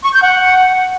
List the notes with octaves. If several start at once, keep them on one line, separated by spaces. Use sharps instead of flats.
C#6
G6
F#5